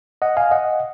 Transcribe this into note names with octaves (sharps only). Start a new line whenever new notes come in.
D#5 F#5
F5 G#5
D#5 F#5